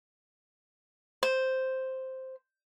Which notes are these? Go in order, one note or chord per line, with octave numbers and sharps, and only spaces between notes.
C5